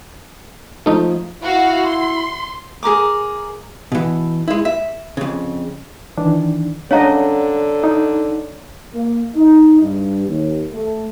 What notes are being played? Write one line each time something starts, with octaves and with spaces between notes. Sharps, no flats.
F3 A3 D#4
E4 F#4 F5
C6
G#4 A#4 A#5 D6
B2 E3
G#3 E4
E5
F2 C#3
D#3 E3 D4
D3 C#4 D4 C#5 D#5 F5 F#5 A#5
D#4
A#3
D#4
G2
D#2
A3